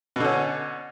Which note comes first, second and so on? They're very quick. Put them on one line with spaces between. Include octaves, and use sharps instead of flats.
B2 D3 C#4